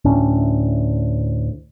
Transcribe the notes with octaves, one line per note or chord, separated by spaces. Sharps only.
D2 A2 C#4 D4